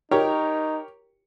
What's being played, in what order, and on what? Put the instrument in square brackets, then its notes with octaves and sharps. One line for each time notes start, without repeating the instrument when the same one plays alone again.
[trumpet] D#4 [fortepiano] G4 A#4 C#5